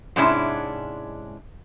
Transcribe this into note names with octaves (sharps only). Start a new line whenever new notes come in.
G#2 C3 G#3 C#4 D4 E4